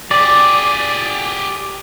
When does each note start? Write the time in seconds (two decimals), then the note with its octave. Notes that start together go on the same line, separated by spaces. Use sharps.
0.11 G4 G#4 D5